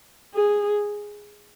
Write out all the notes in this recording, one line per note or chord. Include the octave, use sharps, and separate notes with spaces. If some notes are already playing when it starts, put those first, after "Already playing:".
G#4